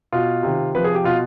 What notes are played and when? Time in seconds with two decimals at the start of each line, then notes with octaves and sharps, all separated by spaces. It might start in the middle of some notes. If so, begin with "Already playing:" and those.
0.12 B2 F4
0.43 C3 D#3
0.75 C3 F3 B4
0.84 G#4
0.95 G4
1.04 B2 F4